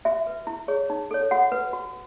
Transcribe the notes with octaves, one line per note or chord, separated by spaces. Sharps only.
F#4 E5
B4
E4
G#4 C#5
D#4
A4 C#5
F#4 F#5
B4
F#4